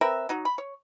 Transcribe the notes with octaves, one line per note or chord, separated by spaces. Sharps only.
C4 A#4 B4 E5
F#3 D#4 F#4
B5
C#5